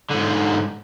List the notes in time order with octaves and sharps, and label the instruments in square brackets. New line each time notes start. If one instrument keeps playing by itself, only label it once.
[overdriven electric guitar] G#2 D3